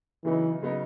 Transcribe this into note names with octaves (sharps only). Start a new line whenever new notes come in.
C#3 E3 F#3 B3 D#4
C#3 F#3 B3 D#4